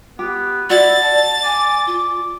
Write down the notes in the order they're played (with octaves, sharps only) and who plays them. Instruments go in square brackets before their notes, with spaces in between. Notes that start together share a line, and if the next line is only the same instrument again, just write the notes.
[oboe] B3 [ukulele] G4
[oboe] E4 [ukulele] F#4 [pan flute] D5 [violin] A6
[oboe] A5
[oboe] D5 [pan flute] G#5
[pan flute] F4